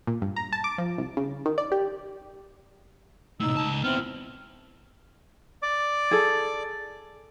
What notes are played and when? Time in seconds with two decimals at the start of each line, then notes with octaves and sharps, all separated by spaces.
0.07 A#2
0.22 G2
0.36 A#5
0.53 A5
0.64 D6
0.78 F3
0.98 C2
1.17 C#3
1.46 D#3
1.58 D5
1.72 G4
3.40 A2 C3 D#4 E6
3.57 C#2 A5
3.84 B3 C4 E4 F6
5.63 D5 D6
6.11 G#4 A4